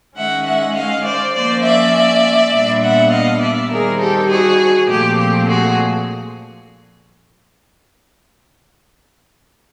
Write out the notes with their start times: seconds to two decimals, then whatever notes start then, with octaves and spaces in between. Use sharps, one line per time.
0.17 D#3 G#3 C#4 E5 F#5
0.47 E5 F#5
0.76 D#5 F5
1.06 C5 D5
1.35 F3 A#3 C#4 C5 D5
1.64 D5 E5
2.54 A#2 G3 B3 D4
2.83 E5 F#5
3.12 D#5 F5
3.41 D5 E5
3.72 D#3 G3 C4 G#4 A#4
4.01 G4 A4
4.30 F#4 G#4
4.90 A#2 F3 A3 C4 G4
5.18 G4
5.48 F#4 G#4